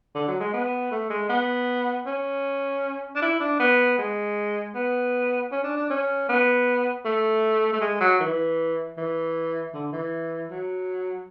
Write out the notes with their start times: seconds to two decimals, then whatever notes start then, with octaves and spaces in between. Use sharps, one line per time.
0.15 D3
0.28 F#3
0.40 G#3
0.53 B3
0.91 A3
1.10 G#3
1.29 B3
2.06 C#4
3.15 D4
3.22 E4
3.40 D4
3.59 B3
3.98 G#3
4.75 B3
5.52 C#4
5.64 D4
5.77 D4
5.90 C#4
6.29 B3
7.05 A3
7.73 A3
7.81 G#3
8.01 F#3
8.20 E3
8.97 E3
9.74 D3
9.92 E3
10.50 F#3